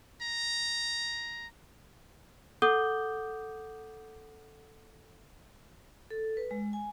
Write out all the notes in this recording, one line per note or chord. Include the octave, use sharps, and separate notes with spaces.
A#5
A4 F#5 D6 D#6 G6 G7
A4
B4
G#3
G#5